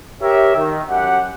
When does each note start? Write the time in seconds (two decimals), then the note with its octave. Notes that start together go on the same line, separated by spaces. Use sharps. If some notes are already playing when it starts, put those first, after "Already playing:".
0.21 G4 A#4 C#5 E5
0.56 D#3
0.89 F#2 G4 F#5